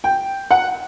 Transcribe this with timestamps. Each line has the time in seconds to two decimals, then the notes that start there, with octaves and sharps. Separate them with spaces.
0.04 G5
0.51 F#5